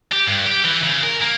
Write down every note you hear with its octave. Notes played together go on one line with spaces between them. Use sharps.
G4
G2
G4
E3
C#3
A#4
A#3